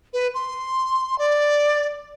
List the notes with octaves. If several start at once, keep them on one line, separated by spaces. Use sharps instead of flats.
B4
C6
D5